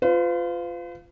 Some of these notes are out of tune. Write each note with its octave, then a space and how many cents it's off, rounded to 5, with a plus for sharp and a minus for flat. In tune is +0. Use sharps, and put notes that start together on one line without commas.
F4 +0 B4 +45